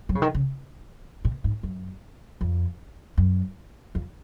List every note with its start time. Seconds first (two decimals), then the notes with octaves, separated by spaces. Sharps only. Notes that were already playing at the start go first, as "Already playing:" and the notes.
0.09 F#3
0.15 C#3
0.22 D#3
0.34 C#3
1.25 A#2
1.44 G#2
1.63 F#2
2.41 F2
3.18 F#2
3.95 F2